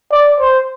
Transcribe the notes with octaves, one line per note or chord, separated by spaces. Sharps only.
D5
C5